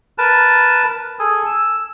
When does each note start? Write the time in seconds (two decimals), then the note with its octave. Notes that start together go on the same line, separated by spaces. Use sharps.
0.18 A#4 B4 A5
1.19 G#4 A4 G#5
1.46 E6